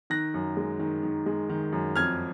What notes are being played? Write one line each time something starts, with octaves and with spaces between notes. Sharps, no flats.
D#3 F#6 A#6
F#2
G#3
D#3
D#3
G#3
D#3
F#2
F2 F6 G#6